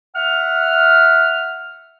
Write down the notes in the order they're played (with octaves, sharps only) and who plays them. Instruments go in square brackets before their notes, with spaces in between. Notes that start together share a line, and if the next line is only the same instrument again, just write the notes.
[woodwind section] E5 F#5 F6